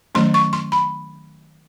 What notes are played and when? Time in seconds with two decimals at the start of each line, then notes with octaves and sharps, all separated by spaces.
0.15 D#3 F#3 A3 C#4 C6
0.34 C#6
0.53 C6
0.72 B5